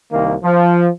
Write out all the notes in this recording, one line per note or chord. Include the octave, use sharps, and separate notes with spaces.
C2 D#3 A#3
F3